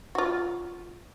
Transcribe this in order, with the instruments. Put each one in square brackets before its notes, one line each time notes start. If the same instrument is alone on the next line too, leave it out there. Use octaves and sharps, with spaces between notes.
[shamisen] F4 F#4